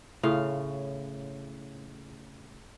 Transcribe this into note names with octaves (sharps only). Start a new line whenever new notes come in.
A2 C#3 F4 F5